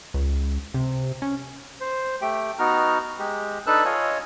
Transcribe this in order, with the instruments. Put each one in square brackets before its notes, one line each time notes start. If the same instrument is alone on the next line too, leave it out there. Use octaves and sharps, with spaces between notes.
[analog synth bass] C#2
C3
C#4
[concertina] C5
A3 G4 G5
B3 D#4 F#4 A#5 F6
G#3 G4
D4 D#4 A4 B4 E6 F#6
F4 C#5 D#5 G#5